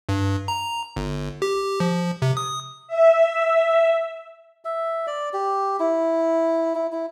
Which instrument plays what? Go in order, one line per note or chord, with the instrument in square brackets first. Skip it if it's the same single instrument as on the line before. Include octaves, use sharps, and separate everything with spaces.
[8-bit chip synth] G2
A#5
G1
G4
F3
C3
D#6
[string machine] E5
[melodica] E5
D5
G4
E4
E4
E4